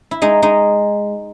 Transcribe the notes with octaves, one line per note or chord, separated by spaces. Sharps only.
E4
G#3 D#4
G#3 D#4